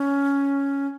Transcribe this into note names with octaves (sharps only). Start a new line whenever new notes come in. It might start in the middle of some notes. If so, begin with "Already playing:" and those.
Already playing: C#4